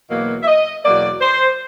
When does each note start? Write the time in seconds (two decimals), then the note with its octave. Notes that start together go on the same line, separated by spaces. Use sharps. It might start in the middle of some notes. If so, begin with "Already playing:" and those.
0.10 E2 B2 F#3 A#3
0.42 E5
0.47 D#5
0.84 E2 B2 F#3 A#3 D5
1.21 C5